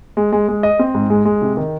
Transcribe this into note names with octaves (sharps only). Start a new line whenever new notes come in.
G#3
G#3
G#3
D#5
C4
G#2
G#3
G#3
C3
D#3